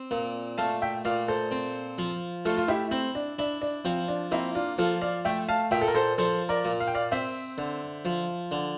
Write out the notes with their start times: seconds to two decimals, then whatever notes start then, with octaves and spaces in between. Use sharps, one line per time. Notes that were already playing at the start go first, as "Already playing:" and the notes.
Already playing: C4
0.11 A#2
0.58 A3 F5 A5
0.82 E5 G5
1.05 A#2 D5 F5
1.28 A4 C5
1.51 C4
1.98 F3
2.45 A3 F4 A4
2.57 F4
2.68 E4 G4
2.91 C4 E4
3.15 D4
3.39 D4 E4
3.62 D4
3.85 F3 C4
4.08 D4
4.31 A#3 C4 E4
4.55 D4 F4
4.78 F3 F4 A4
5.01 D5 F5
5.25 A3 E5 G5
5.49 F5 A5
5.71 A#2 E5 G5
5.81 A4
5.88 A#4
5.95 A4 C5
6.18 F3 A4 C5
6.49 A#4 D5
6.65 A#2
6.80 F5
6.87 G5
6.95 D5 F5
7.11 C4 C5 E5
7.58 D3
8.05 F3
8.51 D3